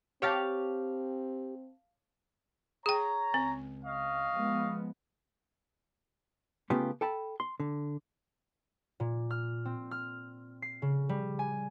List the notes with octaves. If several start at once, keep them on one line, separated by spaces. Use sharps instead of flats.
C4 G4 C#5 F5 A5
G#4 C#5 G5 A#5
C#2 C4
D#5 F5 C#6
F3 G#3 B3
C#3 A3 B3 C#4 F4 G4
A4 G5 A5 B5
C6
D3
A#2
F6
C4
F6
C7
C#3
G3
G#5